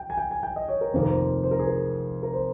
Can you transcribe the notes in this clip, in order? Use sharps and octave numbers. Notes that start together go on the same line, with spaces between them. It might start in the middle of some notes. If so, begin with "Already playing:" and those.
Already playing: G5
G#5
G5
G#5
G5
D#5
C#5
A#4
F1 F2 D#3 A#3 C5
A#4
C5
C5
A#4
G#4
A#4
A#4
C5